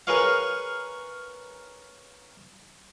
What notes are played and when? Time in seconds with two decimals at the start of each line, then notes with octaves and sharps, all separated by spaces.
0.07 G#4 A#4 B4 C#5 F5